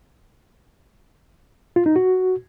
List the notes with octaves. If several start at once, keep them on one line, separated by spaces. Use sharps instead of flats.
F4
D#4
F#4